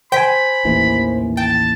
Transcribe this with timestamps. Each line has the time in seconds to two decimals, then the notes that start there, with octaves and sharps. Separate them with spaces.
0.12 C5 G5 G#5 B5 B6
0.65 A1 D#2 E3
1.37 G5 A5